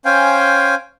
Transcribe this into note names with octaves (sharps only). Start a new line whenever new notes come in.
C#4 C5 F5 G5 G#5